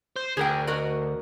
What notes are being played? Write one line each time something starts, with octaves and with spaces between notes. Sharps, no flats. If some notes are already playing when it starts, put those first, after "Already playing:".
C5
D2 G#4 A#4 G5
F#4 A#4 D#5